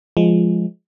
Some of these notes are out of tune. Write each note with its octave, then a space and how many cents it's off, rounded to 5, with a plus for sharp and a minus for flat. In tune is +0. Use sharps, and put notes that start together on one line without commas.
F3 +0 G#3 +0